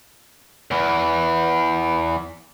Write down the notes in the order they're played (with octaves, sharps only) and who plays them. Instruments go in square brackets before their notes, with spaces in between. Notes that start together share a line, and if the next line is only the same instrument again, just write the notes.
[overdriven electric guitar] E2 E3